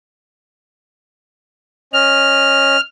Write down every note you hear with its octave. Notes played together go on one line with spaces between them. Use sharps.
C#4 D#5 F6